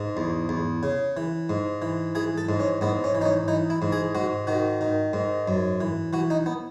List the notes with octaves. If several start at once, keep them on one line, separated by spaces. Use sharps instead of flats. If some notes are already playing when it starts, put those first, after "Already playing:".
Already playing: G#2
E2
E2
C#3
E3
G#2
E3
E3 G#4
A4
G#2
C#4
G#2 B3
C#4
E3
D#4
C#4
E3 D#4
E4
G#2
G#4
G#2 F#4
D#3 F#4
D#3
G#2
F#2
E3
E3 F#4
D#4
B3